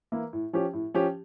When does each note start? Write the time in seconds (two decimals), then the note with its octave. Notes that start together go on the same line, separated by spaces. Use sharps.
0.12 E3 A#3 E4
0.33 A2
0.53 F3 C#4 G4
0.73 A2
0.94 F3 C#4 G4